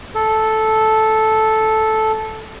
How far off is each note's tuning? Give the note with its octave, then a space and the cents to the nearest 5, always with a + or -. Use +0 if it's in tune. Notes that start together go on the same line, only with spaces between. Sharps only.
A4 -10